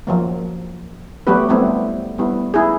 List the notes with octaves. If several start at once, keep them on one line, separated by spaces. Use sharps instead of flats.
F3 F#3 A#3
F#3 A3 B3 F#4 G4 B4
F#3 G3 A3 B3 C4 E4
G3 B3 E4
E4 G#4